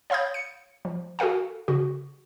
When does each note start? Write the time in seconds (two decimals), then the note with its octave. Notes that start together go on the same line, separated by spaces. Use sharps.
0.10 C#5 F5 B5 D#6 G6
0.34 C#7
0.85 F3
1.19 F#4 A4 A#4 F5 G#5
1.68 C#3 F#4